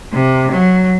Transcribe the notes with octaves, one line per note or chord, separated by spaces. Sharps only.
C3
F#3